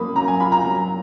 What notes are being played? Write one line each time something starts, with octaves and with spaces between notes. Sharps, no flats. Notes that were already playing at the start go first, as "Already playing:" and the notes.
Already playing: F#3 A#3 B5 D#6
F#3 A#5
G#5
F4 B5
A#5
F#3